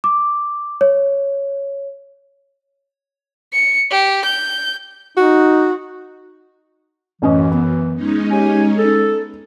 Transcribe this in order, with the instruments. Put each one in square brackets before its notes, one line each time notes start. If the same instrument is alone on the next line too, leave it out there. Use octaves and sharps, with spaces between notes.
[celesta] D6
C#5
[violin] C#7
G4
G6
[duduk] D#4 [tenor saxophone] F#4
[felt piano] A1 C#4 D#5 [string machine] F#2 [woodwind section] E3
[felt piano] B3
[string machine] G#3 C#4 D#4
[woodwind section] G4 C#5 G#5
A4